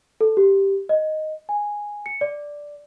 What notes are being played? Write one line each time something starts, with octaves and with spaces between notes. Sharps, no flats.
A4
G4
D#5
G#5
C#7
D5